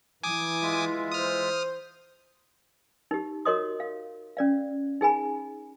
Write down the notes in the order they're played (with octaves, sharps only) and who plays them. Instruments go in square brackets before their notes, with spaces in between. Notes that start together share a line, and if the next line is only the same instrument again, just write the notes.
[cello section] E3 [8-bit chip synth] G#5 D6 D#6
[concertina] G#3 F4 E5
[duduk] C5 [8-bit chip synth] D#6 F6
[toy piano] D#4 G4
F#4 A#4 C#5 D#5 C6 D#6
F5
C#4 D5 F5
D#4 G#4 G#5 B5